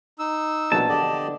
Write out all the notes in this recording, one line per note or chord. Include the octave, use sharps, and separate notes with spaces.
D#4 E6
A#1 E2 B2 F#3 A5
D3 B3 G4 D5 D#5